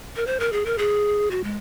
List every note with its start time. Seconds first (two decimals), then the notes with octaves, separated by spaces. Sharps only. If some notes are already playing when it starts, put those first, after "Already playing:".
0.16 A#4
0.27 C5
0.40 A#4
0.53 G#4
0.66 A#4
0.78 G#4
1.31 F#4
1.44 G#3